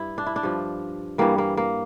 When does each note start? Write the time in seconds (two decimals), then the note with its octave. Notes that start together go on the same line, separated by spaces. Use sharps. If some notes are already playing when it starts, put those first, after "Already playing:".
Already playing: G2 E4
0.18 D4
0.26 E4
0.36 D4
0.43 G2 F3
1.18 G2 E3 G3 A#3
1.38 A#3
1.57 A#3